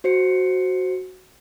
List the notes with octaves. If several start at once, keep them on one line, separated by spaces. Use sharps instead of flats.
F#4 C5 C7 C#7